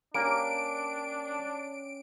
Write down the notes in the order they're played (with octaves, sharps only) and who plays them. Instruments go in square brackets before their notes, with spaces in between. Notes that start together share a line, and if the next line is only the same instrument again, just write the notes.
[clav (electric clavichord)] A#3 [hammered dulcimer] C#4 G4 [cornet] D4 [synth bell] D7